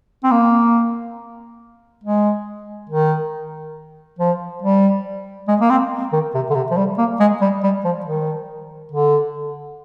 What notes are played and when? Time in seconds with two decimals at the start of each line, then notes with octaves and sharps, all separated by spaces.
0.24 C4
0.31 A#3
2.04 G#3
2.90 D#3
4.19 F3
4.62 G3
5.48 G#3
5.61 A#3
5.70 C4
6.13 D#3
6.34 C3
6.50 D3
6.55 C3
6.71 F3
6.77 G3
6.98 A#3
7.20 G#3
7.41 G3
7.63 G3
7.84 F3
8.06 D#3
8.91 D3